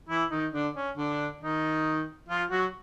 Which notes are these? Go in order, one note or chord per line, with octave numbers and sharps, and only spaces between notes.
E3 E4
D#3 D#4
D3 D4
C#4
D3 D4
D#3 D#4
F3 F4
F#3 F#4